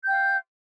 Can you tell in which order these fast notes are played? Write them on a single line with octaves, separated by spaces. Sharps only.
G6 G5 F5